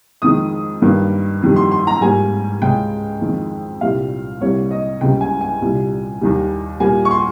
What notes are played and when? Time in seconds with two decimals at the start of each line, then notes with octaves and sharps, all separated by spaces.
0.22 F2 D#3 G#3 D#6
0.82 G2 D#3 A#3
1.42 F2 D#3 G3
1.56 C6
1.71 C6
1.87 A#5
2.01 G#2 G3 A#3 G#5
2.62 C#2 C#3 G#3 G5
3.21 F2 D#3 G#3
3.81 C2 A#2 G3 A#3 F5
4.41 C2 C3 G3 A#3 C#5
4.71 D#5
5.01 C#2 C#3 G3 G5
5.21 G#5
5.41 G#5
5.62 C2 A#2 G3
6.21 D#2 D#3 G3
6.80 A#2 G3 A#3 G#5
7.05 C#6
7.11 C6